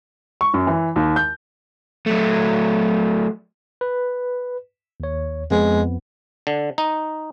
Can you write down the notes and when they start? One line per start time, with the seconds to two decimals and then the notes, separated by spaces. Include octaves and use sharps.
0.41 C#6
0.54 F#2
0.67 E3
0.96 D#2
1.16 G6
2.06 F#3 A3
3.81 B4
5.00 D#2 C#5
5.51 F2 G#3 B3
6.47 D3
6.78 D#4